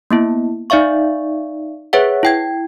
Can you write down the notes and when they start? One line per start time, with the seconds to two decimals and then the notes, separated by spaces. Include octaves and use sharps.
0.11 A#3 B3 E4
0.70 D#4 D5 E5 F5 C#6
1.93 G#4 B4 C#5 E5 F#5
2.23 E4 G5 G#6